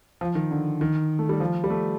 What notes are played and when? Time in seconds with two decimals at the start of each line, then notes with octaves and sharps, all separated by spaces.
0.21 F3
0.35 D#3
0.51 D3
0.81 D#3
1.19 A3
1.29 G3
1.40 F3
1.64 G3
1.70 A3